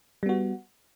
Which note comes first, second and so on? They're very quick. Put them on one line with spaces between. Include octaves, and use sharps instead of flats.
G3 B3 F#4